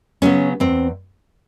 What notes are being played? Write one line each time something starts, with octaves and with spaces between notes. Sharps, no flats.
C#3 F#3 B3 C#4
E2 C4